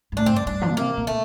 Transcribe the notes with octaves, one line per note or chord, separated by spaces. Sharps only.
G2
A2 D4
C4
G2 D4
G2 D4
F3
A#2
C3 A#3
A#2
A3